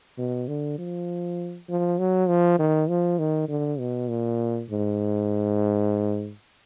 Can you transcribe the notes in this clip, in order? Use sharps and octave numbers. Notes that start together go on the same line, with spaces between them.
B2
D3
F3
F3
F#3
F3
D#3
F3
D#3
D3
B2
A#2
G#2